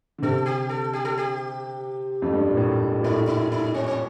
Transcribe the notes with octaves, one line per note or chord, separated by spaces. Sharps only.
D3
C3 A4
G4
A4
G4
A4
G4
F2
G2
A#2
A2
A2
A#2
A2 D#4
D#4
D#4
C4
C4